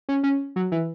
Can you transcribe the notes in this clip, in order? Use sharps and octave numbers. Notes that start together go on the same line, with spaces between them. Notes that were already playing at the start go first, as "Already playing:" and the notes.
C#4
C#4
F#3
E3